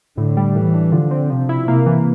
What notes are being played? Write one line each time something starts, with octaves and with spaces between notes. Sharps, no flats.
A2 D3
G3
A2 E3
D4
D3 F3
C4
C3 F3
E4
C3 A#3
E3